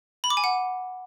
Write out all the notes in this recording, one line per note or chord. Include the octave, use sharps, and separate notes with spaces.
B5
D6
G#5
F#5